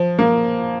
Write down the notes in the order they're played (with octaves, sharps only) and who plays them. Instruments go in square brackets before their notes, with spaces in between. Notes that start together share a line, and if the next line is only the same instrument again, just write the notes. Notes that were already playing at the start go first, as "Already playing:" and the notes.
Already playing: [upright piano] F3
A#3